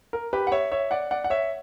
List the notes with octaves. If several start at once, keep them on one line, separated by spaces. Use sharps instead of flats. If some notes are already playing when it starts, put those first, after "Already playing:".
A#4
G4 B4
F#5
C#5 E5
C#5 E5
D5 F#5
D5 F#5
F#5
C#5 E5